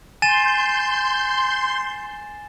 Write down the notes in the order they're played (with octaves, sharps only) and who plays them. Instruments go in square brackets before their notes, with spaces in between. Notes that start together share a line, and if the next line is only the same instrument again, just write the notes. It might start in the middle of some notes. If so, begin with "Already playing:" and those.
[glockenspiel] G#5 A6 E7 [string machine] C6 G6